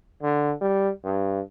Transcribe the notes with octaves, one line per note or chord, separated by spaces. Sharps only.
D3
G3
G2